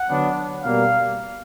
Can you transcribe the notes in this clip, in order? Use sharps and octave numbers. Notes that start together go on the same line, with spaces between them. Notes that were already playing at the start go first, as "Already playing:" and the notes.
Already playing: F#5
D3 F#3 B3 D4
B2 G3 A#3 F5